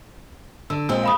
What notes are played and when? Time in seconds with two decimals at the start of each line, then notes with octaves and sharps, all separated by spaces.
0.70 D3 E6
0.89 A#2 G#3 C4 E6
1.04 F5 B5 D#6